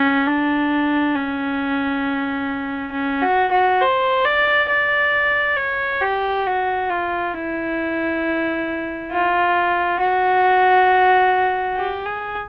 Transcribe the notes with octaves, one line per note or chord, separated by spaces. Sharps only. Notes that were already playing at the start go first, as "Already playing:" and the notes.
Already playing: C#4
D4
C#4
C#4
F#4
F#4
C5
D5
D5
C#5
G4
F#4
F4
E4
F4
F#4
G4
G#4